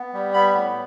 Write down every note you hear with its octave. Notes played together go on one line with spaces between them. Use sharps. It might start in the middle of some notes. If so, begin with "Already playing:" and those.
Already playing: B3
G3
B3 B5
A2